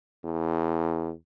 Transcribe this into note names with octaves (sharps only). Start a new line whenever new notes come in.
E2